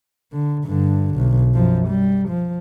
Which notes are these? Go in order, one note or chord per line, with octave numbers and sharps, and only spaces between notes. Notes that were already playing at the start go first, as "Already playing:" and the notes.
D3
G2 D3
B1
F#2 F3
G3
F3